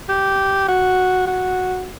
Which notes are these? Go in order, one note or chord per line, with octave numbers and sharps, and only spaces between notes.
G4
F#4
F#4